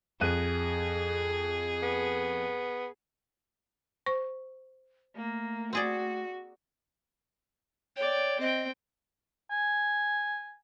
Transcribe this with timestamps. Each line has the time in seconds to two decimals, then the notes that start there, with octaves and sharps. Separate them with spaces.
0.21 F2 G#4 F#6 D#7
1.83 B3
4.06 C5 C#6
5.16 A3 A#3
5.73 C4 F#4 G#4 D5
7.97 C#5 D5 G5
8.40 C4 D#5 G5
9.50 G#5